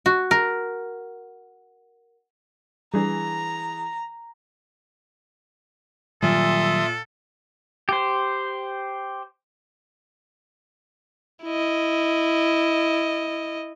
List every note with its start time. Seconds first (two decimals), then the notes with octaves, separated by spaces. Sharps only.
0.06 F#4
0.31 A#4
2.94 E3 G3 D4 G#4 A#5
6.22 A#2 D#3 F#3 G3 A4 E5 C6 D#6
7.89 G4 C5
11.45 E4 D#5